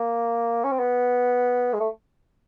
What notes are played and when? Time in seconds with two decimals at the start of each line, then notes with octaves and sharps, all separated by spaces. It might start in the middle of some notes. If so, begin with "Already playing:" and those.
Already playing: A#3
0.64 C#4
0.72 C4
0.80 B3
1.73 G#3
1.80 A3